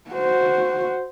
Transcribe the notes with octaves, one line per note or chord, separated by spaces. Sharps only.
F#4 C5